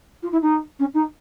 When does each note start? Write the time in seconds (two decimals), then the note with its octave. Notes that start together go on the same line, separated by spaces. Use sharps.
0.22 F4
0.32 E4
0.42 D#4
0.79 C#4
0.94 D#4